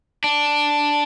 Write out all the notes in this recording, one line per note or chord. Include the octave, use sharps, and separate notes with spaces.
D4